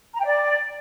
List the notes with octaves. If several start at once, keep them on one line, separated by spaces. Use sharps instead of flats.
A#5
G5
D5